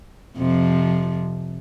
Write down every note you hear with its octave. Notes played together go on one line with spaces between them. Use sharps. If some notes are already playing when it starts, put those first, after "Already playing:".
F2 C3 F3